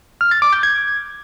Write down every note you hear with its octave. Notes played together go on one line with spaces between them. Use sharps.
F6
A6
D6
G6
G#6